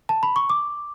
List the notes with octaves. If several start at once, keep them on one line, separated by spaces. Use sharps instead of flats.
A5
B5
C#6
D6